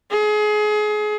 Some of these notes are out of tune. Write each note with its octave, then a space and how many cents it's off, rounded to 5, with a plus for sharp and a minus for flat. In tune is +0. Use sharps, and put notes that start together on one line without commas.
G#4 +30